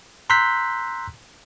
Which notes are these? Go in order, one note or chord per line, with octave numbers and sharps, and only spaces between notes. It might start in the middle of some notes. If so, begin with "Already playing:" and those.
A#5 C6 E6 F#6 G6 B6